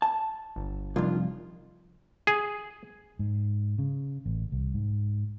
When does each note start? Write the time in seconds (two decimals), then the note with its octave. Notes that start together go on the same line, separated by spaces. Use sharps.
0.02 A5
0.56 G1
0.96 C2 F2 D#3 D4 F4
2.27 G#4
3.19 G#2
3.78 C#3
4.26 A1
4.52 C2
4.74 G#2